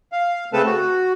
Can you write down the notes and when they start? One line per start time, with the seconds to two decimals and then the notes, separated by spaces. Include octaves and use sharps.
0.12 F5
0.53 C#3 A3 C4 A4 B4 A5
0.66 F#4